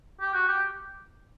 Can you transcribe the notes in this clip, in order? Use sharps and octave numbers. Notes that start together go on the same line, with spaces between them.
G4
F#4
G4